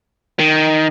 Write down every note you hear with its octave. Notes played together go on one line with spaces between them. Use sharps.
D#3